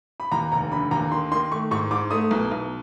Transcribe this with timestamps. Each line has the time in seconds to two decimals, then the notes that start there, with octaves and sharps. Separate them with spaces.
0.20 B5
0.32 D#2 A#5
0.52 F1 A#5
0.72 D3 B5
0.91 D#2 A#5
1.12 D#3 C6
1.31 D#3 C6
1.51 A3 C#6
1.71 G#2 C#6
1.91 G#2 D6
2.11 A3 D#6
2.31 B1
2.51 B1